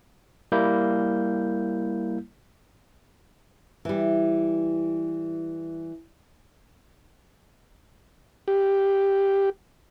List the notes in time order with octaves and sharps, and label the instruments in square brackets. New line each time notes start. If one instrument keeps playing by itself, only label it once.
[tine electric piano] G3 A#3 E4 G6
[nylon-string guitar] E3 G3
[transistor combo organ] G4